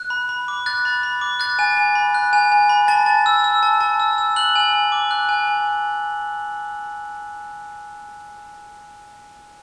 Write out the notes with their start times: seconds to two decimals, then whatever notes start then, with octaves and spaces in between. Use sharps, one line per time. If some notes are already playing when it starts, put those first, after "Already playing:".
Already playing: F#6
0.10 B5
0.29 B5
0.48 D6
0.66 F#6 A6
0.85 B5
1.03 B5
1.21 D6
1.40 F#6 A6
1.59 G#5
1.77 G#5
1.95 B5
2.15 F#6
2.33 G#5
2.52 G#5
2.69 B5
2.88 A5 A6
3.06 A5
3.26 E6
3.44 E6
3.63 A5
3.81 A5
4.00 E6
4.18 E6
4.36 F#6 F#7
4.56 G#5
4.73 G#5
4.92 D6
5.11 F#6
5.29 G#5
5.47 G#5